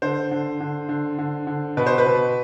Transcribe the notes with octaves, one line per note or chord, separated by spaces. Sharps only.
D3 C5
D3
D3
D3
D3
D3
B2 B4
C5
B4
B2